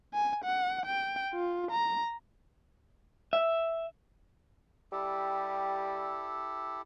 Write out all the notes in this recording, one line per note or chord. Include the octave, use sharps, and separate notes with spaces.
G#5
F#5
G5
F4
A#5
E5
G3 E4 G4 A4